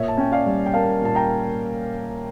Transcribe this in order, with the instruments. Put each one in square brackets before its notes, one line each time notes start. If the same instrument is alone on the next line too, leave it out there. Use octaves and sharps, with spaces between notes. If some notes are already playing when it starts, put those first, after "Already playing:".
Already playing: [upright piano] A#2 C#5 E5
A5
C#4 G5
D5 F5
G3
G5
A#3 F5 A5
A#2 A5
G5 A#5